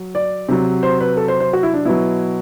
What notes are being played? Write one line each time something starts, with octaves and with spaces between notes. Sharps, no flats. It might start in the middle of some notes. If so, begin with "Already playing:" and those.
Already playing: F#3
D5
C3 F#3
C5
B4
A4
C5
C5
F#4
E4
D4
B2 F#3 E4